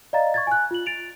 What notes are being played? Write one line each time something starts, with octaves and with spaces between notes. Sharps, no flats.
D5 D#5 F5 A#5 A6
C#6 G#6 A6
G#5 F#6
F4 F#7
A6 D7 F7